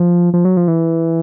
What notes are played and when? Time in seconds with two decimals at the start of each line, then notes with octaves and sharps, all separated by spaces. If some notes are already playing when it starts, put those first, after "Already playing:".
Already playing: F3
0.34 F3
0.45 F#3
0.57 F3
0.68 E3